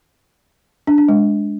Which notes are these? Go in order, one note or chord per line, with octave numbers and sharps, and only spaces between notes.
D4
D4
G#3